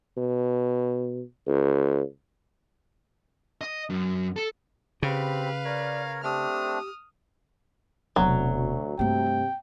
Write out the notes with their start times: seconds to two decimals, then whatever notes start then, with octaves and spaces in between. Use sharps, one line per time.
0.17 B2
1.47 C#2
3.61 D#5
3.90 F#2
4.36 A4
5.03 C#3 C4 G4 B4 F5 B5
5.65 A#4 C#5 D5
6.23 A3 C4 D4 G4 D#6 F6
8.16 E1 D2 C3 F#3
8.99 G2 C3 A3 G5